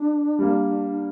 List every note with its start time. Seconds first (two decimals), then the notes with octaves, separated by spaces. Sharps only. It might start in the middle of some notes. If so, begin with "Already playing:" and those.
Already playing: D4
0.39 G3 A#3